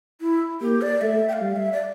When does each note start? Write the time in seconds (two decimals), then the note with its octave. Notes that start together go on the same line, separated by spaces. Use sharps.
0.21 E4
0.61 A#3 G4
0.81 D5
1.01 A3 E5
1.29 G5
1.33 F5
1.42 G3
1.56 E5
1.73 D5